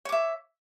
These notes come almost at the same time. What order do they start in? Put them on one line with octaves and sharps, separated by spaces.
C#5 D6 E5